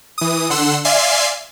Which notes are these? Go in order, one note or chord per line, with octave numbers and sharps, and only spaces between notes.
E3 D#6
D3 F#5 C6 E6
D5 E5 F5 G#5 C6 C7